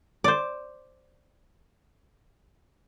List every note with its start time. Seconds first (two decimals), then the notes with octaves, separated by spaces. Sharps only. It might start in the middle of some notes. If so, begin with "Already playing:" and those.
0.24 C5 D5